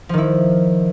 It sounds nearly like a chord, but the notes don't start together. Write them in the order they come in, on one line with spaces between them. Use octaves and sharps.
F3 D#3 E4